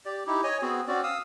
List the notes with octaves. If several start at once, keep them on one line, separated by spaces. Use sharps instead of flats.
G4 D5
D#4 E4 G4
C#5 D#5 G#5
B3 C4 F#4 G#4
C4 C#4 F#4 D5
F5 D#6 E6